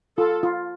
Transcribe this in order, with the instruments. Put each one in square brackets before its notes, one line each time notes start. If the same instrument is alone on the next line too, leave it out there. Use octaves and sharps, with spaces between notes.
[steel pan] F4 [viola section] A4
[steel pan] F4